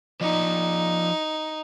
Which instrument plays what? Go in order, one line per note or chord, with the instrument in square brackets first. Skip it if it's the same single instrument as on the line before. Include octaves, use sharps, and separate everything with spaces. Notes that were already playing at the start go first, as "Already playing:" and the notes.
[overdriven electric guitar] F3 D5 [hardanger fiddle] D#4